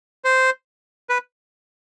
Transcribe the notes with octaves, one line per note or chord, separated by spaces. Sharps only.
C5
B4